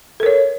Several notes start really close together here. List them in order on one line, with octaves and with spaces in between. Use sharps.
A4 A#4 C#5